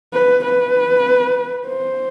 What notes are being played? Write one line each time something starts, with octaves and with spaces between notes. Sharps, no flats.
B4
B4
C5